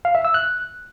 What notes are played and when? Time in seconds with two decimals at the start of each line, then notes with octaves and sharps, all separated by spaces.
0.05 F5
0.15 E5
0.25 E6
0.34 F#6